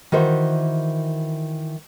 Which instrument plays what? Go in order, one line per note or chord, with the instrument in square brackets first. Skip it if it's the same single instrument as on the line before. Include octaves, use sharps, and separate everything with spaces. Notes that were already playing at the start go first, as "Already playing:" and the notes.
[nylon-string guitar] D#3 E3 F#4 C5 E5